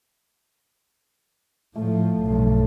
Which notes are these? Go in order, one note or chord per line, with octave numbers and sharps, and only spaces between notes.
A2 F3 A3
B1 G2